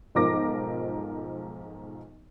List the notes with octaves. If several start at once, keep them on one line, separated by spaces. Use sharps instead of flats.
B1 G#2 F3 A#4 D6 A#6